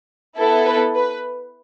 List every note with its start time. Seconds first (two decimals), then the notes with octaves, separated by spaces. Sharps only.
0.36 B3 E4 A4
0.66 B4
0.95 B4